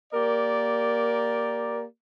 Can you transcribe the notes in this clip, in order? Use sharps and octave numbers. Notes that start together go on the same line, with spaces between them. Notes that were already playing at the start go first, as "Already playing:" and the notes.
A#3 G4 A#4 D5